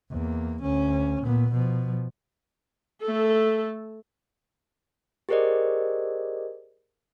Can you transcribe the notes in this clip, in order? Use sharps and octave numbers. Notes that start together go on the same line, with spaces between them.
E2 A#3
D2 C#4
A#2 B3
B2 F3
A3 A4
G4 G#4 A#4 C5 D5 D#5